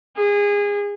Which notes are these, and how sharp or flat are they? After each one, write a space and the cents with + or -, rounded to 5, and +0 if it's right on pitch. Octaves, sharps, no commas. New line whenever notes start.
G#4 -25